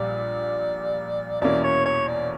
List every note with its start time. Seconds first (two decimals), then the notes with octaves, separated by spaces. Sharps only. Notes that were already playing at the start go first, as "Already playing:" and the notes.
Already playing: A#1 A#2 G3 D5
1.42 E2 B2 A#3 C#4 E4 D5
1.63 C#5
1.85 C#5
2.07 D5